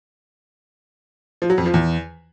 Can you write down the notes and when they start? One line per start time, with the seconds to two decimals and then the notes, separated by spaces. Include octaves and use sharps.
1.42 F3
1.50 F#3
1.58 F2
1.66 F3
1.74 E2